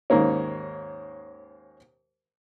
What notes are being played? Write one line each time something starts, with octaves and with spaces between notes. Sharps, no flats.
D#2 G#2 A#3 C#4